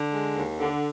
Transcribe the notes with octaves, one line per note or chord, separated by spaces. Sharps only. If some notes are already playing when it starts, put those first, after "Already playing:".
Already playing: D3
G#3
D#2
D3